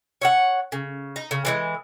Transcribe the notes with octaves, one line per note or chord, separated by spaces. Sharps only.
C#5 E5 F#5
C#3
D#4
C#3
E3 G3 G#3